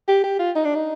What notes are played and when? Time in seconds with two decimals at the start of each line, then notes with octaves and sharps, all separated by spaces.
0.08 G4
0.24 G4
0.39 F4
0.56 D#4
0.65 D4
0.75 D#4